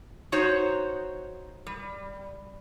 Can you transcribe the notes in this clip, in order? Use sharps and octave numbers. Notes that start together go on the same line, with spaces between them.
D#4 F#4 C5 C#5
G3